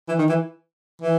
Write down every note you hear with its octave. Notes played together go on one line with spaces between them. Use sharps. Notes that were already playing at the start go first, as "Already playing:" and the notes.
E3
D#3
E3
E3